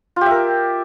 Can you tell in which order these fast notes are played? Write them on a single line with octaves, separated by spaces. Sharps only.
F4 G4 E5 A#4